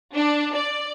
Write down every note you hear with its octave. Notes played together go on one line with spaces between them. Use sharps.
D4
D5